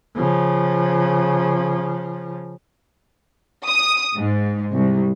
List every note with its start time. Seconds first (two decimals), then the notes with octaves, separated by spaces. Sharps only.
0.16 C#3 F3
3.66 D#6
4.16 G#2
4.74 C2